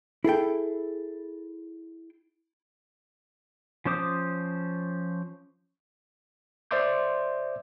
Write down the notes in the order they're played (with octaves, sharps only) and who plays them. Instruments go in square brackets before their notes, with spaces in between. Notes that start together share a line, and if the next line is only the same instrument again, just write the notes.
[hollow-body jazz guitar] E4 G#4 A4 G5
[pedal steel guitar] F3 C#4 C5 D6 D#6
[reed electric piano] C5 D5 E5 C6 D6 G6